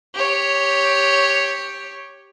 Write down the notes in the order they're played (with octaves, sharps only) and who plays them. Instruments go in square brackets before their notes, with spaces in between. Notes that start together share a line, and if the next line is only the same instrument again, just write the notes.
[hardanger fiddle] G4 C#5